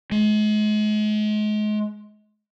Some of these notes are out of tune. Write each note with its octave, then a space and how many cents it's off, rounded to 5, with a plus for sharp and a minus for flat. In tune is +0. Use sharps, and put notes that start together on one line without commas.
G#3 +35